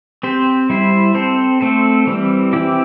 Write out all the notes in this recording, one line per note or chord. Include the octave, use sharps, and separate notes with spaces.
C4 G4 C5
G3 E4 C5
C4 A4 C5
A3 C4 A4 C5
E3 G3 C4
E3 C4 E4 G4